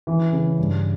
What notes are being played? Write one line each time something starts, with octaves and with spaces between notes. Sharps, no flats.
E3
C#3
G2